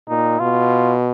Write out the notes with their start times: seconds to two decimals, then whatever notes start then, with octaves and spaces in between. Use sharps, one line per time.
0.09 A#2 D#4
0.40 B2 F4